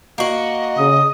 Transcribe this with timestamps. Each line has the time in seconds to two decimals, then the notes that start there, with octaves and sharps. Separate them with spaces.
0.18 A#3 F#4 D#5
0.78 C#3 D#6